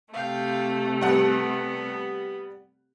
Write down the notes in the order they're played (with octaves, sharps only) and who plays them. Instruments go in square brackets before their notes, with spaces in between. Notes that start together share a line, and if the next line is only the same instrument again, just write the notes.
[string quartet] C3 A3 [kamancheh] F5 G5
[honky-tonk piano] G3 F#5 [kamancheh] B3